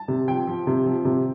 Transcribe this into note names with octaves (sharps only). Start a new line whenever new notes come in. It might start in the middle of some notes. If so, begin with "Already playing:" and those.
Already playing: A5
C3
F3 G5
F3
C3
F3
C3